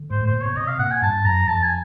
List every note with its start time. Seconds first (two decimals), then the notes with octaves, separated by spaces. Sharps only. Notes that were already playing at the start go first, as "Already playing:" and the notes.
Already playing: D3
0.10 G#2 C5
0.21 A2 C5
0.33 A#2
0.41 B2 C#5
0.57 C3 D#5
0.68 F5
0.79 A#2 F#5
0.91 G#5
1.02 G2 A5
1.25 F#2 A#5
1.48 F2 A5
1.63 G#5